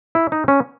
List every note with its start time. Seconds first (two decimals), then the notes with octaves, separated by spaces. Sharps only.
0.15 E4
0.32 D#4
0.48 C#4